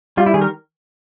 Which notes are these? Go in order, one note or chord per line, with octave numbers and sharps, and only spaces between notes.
G3 F4
E4
D#3 G#4
A#4